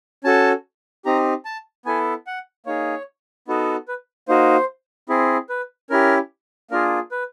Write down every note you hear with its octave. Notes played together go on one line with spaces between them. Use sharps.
C#4 F#4 A4 A5
C4 D#4 G4 A#5
A5
B3 E4 A4 G#5
F#5
A#3 D#4 G#4 C#5
B3 D#4 F#4 A4
B4
A#3 D#4 F#4 C5
C4 E4 G#4
B4
C#4 E4 G4 A#4
A#3 D4 F4 G#4 A#4
B4